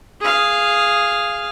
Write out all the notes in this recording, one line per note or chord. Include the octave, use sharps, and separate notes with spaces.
G#4 F5